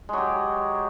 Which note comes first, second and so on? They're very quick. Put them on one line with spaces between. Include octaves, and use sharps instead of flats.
G#3 F#3 G4